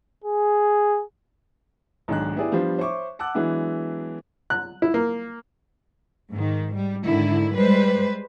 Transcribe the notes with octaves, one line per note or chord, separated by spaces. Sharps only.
G#4
B1 G#2 D#3 D4 D#5 F#6
B3 E4 G4 G#4 D5
F3 G3 B3 D4 C5
C5 C#5 E5 C#6 D6
F#5 A5 D6 E6 F#6
E3 F#3 G#3 B3 D4 E4
F#6
E4
A#3
G#2 D#3
G3
G#2 D3 D#3 E4
G3 G#3 B4 C5